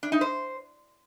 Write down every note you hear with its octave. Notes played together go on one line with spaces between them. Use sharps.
D4
D#4
C5